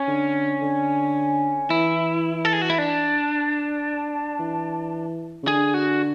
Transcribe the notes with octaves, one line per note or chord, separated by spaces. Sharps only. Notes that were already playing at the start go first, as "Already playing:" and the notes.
Already playing: C#4
D3
D3
E3 E4
A4
G#4
F#4
E4
D4
E3
C#3
D3 G#4
F#4